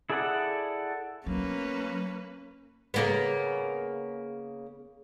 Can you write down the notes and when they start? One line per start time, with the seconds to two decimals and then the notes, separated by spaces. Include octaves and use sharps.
0.10 E4 G#4 A4 D5 F#5
1.26 F#3 A#3 B3 C#4 B4
2.94 C#3 A#3 B3